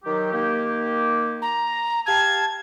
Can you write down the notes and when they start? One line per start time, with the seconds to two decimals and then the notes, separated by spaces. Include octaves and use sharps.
0.04 D#3 F#3 G4
0.32 D#3 A#3 G4
1.42 A#5
2.06 G4 F5 A5 G#6